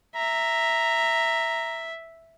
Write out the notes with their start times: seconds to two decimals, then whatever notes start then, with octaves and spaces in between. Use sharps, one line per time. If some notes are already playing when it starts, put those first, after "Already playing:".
0.15 E5 A#5